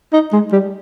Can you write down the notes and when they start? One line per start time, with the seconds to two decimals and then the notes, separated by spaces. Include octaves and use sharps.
0.13 D#4
0.33 G#3
0.52 G3